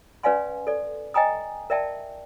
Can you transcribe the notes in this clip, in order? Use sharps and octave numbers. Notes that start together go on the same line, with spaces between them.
C#4 B4 D5 F5 G#5 C6
A4 D5
D#5 G5 G#5 A#5 D#6
A#4 D5 E5 G5 A5